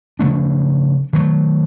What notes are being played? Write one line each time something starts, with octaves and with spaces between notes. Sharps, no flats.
C#3 F3 A3 D4
D#3 F#3 A3